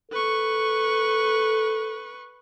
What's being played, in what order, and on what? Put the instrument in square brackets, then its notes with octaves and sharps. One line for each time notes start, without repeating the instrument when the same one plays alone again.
[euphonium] A4 [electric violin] B4 C#6